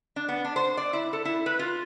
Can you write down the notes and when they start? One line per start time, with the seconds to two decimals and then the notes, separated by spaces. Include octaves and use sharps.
0.16 D4
0.28 B3
0.45 D4
0.56 C5
0.77 D5
0.93 E4
1.13 A4
1.25 E4
1.46 B4
1.59 F4